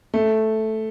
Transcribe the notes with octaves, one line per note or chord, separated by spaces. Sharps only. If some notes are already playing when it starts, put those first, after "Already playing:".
A3